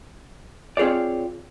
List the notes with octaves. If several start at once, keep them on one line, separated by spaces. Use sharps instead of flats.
C4 F4 G#4 C#5 D5